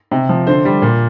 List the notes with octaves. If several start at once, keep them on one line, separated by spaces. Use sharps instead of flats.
C3
F3
D3 C5
G3
A#2